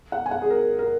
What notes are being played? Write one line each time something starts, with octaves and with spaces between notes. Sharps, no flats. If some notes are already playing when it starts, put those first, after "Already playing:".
F#5
G#5
F#5
G#4
A#4
A#4